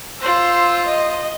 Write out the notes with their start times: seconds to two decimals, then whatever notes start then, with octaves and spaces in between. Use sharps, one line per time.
0.21 F4 C5 E6
0.86 D#5